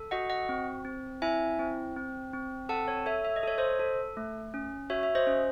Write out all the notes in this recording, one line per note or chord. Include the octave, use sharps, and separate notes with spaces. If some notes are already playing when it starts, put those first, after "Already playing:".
Already playing: A4
F#4 D#5 F#5
D#5 F#5
C4
C4
E4 E5 G#5
C4
C4
C4
A4 F#5 A5
C#5
A4 C#5 E5
E5
D#5
A4 C#5
C5 D#5
A4
A3
C#4
F#4 C#5 E5
E5
C5 D#5
C#4